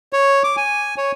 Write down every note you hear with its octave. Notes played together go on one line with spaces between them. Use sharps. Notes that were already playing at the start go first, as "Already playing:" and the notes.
C#5
D6
G#5
C#5